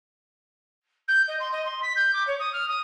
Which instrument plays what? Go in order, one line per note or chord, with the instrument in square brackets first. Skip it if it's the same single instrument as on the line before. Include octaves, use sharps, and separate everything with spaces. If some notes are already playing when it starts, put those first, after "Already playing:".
[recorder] G6
D#5
C6
D#5
C6
B6
G6
D6
C#5
D#6
F6
D#6